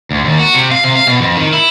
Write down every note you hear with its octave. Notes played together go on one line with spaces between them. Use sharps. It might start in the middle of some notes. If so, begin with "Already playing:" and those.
D2
D#2
F#4
C3
F5
C3
F5
B2
F2
D#3
E4